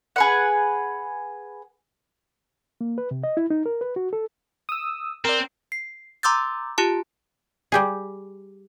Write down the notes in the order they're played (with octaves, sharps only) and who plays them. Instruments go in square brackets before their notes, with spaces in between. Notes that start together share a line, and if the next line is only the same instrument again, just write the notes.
[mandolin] G#4 B4 F#5
[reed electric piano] A#3
B4
C3
D#5
E4
D#4
A#4
B4
F#4
A4
[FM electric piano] D#6 E6
[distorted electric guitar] C4 [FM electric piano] A#4 D5
[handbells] C7
A#5 C6 D6 E6 G6 A6
F4 G4 A5
[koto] G3 G4 G#4